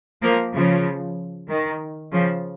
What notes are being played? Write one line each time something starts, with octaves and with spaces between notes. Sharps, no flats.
F3 A#3
C#3 F3
D#3
C#3 F3